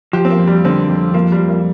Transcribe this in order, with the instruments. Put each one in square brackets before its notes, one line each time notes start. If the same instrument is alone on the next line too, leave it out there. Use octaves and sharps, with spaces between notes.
[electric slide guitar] F3 [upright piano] G4
[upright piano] C4
A#3
[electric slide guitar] F2
[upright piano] G3
[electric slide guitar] D3 [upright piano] C4
[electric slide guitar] F2
[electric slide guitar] F3 [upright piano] A#3
[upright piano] G3
[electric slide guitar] F2
[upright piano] A#3